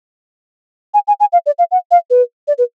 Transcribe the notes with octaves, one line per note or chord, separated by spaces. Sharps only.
G#5
G#5
G#5
F5
D5
F5
F#5
F5
B4
D5
B4